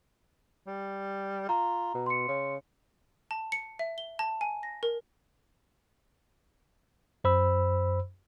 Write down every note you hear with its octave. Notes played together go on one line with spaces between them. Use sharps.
G3
F4 A#5
B2
C6 C#7
C#3
A5
C#7
E5
G7
A5
G#5
A#6
A#4
F#2 C5 B5 E6